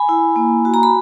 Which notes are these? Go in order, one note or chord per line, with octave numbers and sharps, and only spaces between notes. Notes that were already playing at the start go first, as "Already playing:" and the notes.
Already playing: G#5 B5
E4
A#3
F#4
A#5
B5